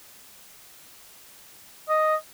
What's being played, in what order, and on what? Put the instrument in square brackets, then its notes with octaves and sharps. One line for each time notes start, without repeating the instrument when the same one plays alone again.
[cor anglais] D#5